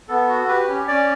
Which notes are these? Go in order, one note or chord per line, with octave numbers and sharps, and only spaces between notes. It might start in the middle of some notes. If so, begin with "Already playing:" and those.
B3 A4
F#4
G4 B4
C#4
C#4 D5